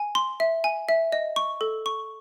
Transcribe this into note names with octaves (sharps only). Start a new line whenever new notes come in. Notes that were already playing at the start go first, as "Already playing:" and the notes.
Already playing: G#5
C6
E5
G#5
E5
D#5
C#6
A4
C#6